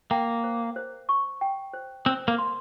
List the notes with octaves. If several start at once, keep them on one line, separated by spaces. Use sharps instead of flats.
A#3 G5
C5
C5
C#6
G5
C5
C4 C5
A#3
C6